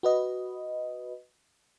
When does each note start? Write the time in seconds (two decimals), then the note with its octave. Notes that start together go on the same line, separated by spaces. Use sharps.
0.03 F#4 B4 D#5